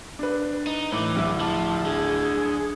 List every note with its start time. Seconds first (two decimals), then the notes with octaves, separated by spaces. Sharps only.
0.19 D4 B4
0.67 D#4
0.92 A2 E3 D6
1.16 D1 E4 E5
1.40 F3 A5
1.85 D3 G#4